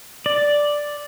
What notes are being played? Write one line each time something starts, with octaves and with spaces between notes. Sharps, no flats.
D5